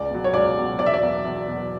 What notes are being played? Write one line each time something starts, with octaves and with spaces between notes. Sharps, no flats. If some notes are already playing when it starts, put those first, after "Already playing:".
Already playing: C#2 D5
B2 F#3
C#5
C#2 D5
B2 F#3
E2 D5
E5
D5
B2 F#3
E2
B2 F#3